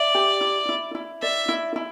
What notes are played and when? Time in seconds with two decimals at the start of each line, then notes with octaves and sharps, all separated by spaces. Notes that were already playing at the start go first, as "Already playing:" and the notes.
Already playing: D5 E5
0.15 G4
0.41 E4
0.69 E4
0.95 E4
1.22 D5 E5
1.49 E4
1.76 E4